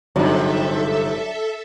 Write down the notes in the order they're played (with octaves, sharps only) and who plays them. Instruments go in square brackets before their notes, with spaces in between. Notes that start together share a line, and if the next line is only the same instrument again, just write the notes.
[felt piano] G1 D#4 [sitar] G#2 C3 [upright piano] F#3 D4 [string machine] A4 E5